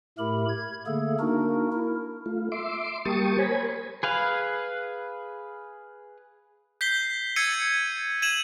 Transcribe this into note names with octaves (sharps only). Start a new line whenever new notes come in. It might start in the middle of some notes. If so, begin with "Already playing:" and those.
A2 A3 G4 A#4 B5
G#6
D3 A3 A#3 G#4 A4
A#3 D4 D#4 F#4 A#4
E4 A#4
A3 F4
E5 C6 D6
G3 A#3 G4 A5 C#6 D#6
A#4 C5 C#5 G#5 B5
G#4 B4 F5
G6 B6 C7 G7
E6 G#6 A6 C7 C#7 D#7
G#6 D#7 E7 F#7